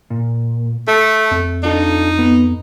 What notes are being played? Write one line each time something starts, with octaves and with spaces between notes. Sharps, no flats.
A#2
A3 A4
F2
D4 D#4 F4 A4
B3